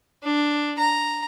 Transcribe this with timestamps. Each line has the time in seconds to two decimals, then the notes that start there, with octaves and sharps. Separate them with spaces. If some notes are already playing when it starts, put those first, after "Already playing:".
0.23 D4
0.79 A#5